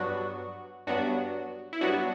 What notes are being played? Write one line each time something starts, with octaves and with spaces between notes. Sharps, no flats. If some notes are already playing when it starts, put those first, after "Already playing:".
Already playing: G2 F#3 B3 D4 F#4
G2 F#3 B3 D4 F#4
E4
G2 F#3 B3 D4 F#4